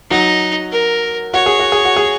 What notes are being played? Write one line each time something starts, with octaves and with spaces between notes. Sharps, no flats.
F#3 D#4 F#4
A#4
F#4 C#5
G#4
F#4
G#4
F#4
G#4